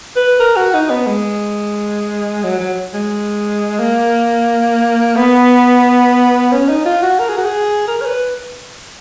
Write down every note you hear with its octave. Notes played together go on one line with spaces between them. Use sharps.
B4
A#4
F#4
D#4
B3
G#3
F#3
F#3
G#3
A#3
B3
C#4
D#4
F4
F#4
A#4
G#4
F#4
G#4
A#4
C#5
B4